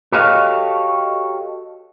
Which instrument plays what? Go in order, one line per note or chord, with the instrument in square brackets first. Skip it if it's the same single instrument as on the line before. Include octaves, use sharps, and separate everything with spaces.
[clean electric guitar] F#4 G4 A4 C#5 D#5 F5